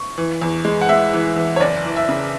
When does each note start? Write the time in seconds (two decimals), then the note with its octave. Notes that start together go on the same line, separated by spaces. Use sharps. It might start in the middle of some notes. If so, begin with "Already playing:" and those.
Already playing: C#6
0.18 E3
0.41 E2
0.65 G#3
0.81 F#5
0.89 G#3 E5
1.13 E3
1.36 E2
1.56 C#5
1.60 F#1 D5
1.85 E3
1.96 E5
2.09 C#3